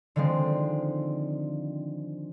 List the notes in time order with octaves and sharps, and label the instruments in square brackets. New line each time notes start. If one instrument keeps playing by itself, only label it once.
[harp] D3 D#3 F3 G#3 C4